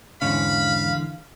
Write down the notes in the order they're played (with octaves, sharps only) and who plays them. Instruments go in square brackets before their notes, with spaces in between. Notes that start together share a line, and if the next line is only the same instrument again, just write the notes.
[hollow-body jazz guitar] E2 G#2 C#4 [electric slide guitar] D3 E3 [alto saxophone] F5 [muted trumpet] B5